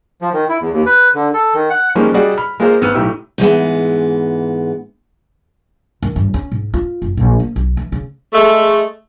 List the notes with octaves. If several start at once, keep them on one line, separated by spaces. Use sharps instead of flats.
F3
D#3
E4
E2
D#2
B4
D3
A4
D#3
F#5
D#3 F3 G3 G#3 A#3 C#4
G3 F#4 G#4 D5 D#5 F#5
B5 F6
G#3 A#3 F4 G#4 A#4 C5
G#1 B3 E6 F6 D#7
B1 A2 A3 G4 E6
G#2 E3 G#3 B3
D#3
G2
C#4
G#2
F4
F#1
A#1
A#3
B1
E3
C#3
G#3 A3